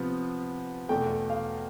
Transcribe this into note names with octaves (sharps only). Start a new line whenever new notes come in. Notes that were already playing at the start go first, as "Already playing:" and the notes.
Already playing: C3 F3 B3
E2 B2 A3 G5
F5